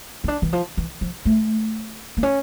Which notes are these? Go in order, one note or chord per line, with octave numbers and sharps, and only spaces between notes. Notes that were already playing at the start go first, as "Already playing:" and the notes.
C#4
D4
E3
F3
E3
F3
A3
A#3
C#4